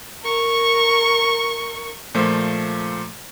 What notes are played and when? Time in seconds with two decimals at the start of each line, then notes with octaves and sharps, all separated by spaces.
0.23 A#4 C#6
2.15 A#2 F3 A3 C5